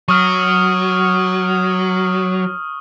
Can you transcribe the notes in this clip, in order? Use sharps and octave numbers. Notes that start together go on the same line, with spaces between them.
F#3 C#6 D#6 F6